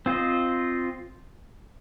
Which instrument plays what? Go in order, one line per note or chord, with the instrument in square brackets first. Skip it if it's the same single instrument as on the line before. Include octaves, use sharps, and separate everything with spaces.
[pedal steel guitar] C4 F4 C5 D#5